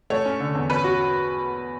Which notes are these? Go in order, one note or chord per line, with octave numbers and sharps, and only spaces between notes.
A3 C#5
C#4
D3
E2
C#4 B4
F#4